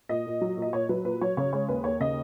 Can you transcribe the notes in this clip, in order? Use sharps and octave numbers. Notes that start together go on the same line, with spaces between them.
A#2 D#5
A#2
F#3
A#2
D#5
A#2 C#5
F#3 B4
A#2 B4
F#3 C#5
C#3 C#5
G#3 C#5
D#2 B4
D#2 C#5
C#3 D#5